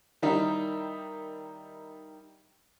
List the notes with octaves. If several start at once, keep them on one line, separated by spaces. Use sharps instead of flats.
D#3 G3 D#4 E4